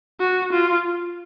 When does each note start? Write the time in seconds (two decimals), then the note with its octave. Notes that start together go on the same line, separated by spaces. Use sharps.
0.20 F#4
0.53 F4